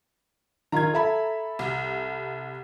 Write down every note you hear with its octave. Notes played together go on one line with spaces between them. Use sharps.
D#3 F4 A#5 G#6
A4 E5 B5
C2